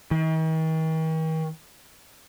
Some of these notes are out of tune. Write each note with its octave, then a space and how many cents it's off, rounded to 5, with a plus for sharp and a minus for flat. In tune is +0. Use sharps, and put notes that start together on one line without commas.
D#3 +45